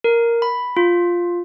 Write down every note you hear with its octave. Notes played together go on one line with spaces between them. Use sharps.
A#4
B5
F4